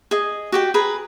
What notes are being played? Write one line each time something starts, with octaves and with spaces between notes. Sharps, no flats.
G#4 D#5
F#4 G4 G5
G#4 B4 A#5 B5